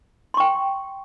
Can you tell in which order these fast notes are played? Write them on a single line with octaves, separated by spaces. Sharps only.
C6 C#6 G5